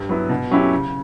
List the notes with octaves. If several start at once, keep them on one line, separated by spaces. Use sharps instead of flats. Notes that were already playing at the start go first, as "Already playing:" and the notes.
Already playing: G2
F#3 B3 E4
B2
F#3 C#4 E4 G4
C#3